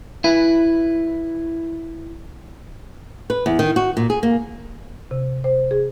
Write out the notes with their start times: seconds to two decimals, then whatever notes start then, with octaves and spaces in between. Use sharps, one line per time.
0.24 E4 B4
3.30 B4
3.46 E2
3.59 D#3
3.76 F#4
3.97 A#2
4.10 G#4
4.23 A#3
5.11 C3
5.44 C5
5.71 G#4